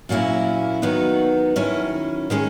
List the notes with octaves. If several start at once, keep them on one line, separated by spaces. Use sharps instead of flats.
A#2 F#3 A#3 C#4 E4
D#3 F#3 B3 D#4 F#4
D#3 F#3 C#4 E4
D#3 G#3 C#4